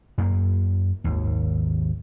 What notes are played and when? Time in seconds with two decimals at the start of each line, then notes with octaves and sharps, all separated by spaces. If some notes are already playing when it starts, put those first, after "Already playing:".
0.18 F#2 A#3
1.04 G#1 D#2